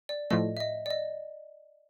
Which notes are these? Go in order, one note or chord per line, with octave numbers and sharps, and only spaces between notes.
D5
A2 F3 A3 D#5
E5
D#5
D5
D#5